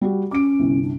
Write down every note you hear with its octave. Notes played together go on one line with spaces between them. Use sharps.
G3 F#4 G4
C#4 D6 D7
G1 C2
D4